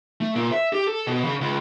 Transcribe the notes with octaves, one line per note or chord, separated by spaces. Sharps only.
A3
A#2
E5
G4
A4
B2
C#3
C#2